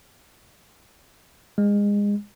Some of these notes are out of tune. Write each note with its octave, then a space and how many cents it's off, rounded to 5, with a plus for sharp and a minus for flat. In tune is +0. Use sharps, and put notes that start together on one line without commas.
G#3 -25